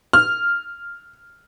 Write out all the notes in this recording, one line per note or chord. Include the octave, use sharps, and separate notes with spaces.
F6